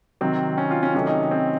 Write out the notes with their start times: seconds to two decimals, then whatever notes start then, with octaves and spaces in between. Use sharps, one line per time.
0.21 C3 D#3 F#3 C4
0.58 C#4
0.71 F4
0.83 C#4
0.94 C3 D#3 F#3 A3 C#4
1.07 D#4
1.31 C4